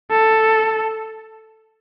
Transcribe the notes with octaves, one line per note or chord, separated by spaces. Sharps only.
A4